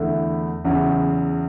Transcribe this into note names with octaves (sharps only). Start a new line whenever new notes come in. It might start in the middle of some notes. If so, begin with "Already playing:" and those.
Already playing: E2 D3 A3 E4
E2 C#3 F#3